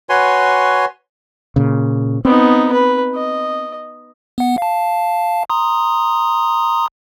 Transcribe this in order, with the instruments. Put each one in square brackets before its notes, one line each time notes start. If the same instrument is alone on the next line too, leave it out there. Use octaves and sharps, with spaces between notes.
[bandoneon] F#4 B4 C#5 G#5 C6
[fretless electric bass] A#2 C#3
[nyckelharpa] B3 D#4 [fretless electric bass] C4
[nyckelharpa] B4
D#5
[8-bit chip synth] B3 F#5
F5 A5
A#5 C6 D#6